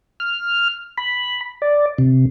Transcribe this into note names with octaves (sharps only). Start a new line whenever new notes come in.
F6
B5
D5
C3